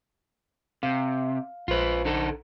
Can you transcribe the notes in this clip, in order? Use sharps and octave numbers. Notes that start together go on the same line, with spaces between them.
C3 F5
A#1 F4 B4 C5
D3 D#4 A4